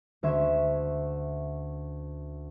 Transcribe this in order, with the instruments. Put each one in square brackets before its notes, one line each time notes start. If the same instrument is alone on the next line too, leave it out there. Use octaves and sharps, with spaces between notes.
[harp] D2 C#4 E5 C6 G#6 E7